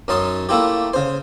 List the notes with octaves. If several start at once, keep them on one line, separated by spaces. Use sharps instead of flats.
F#2 C#4 D#4 A5 C6 D#6
A3 A#3 E4 F4 G4
C#3 C5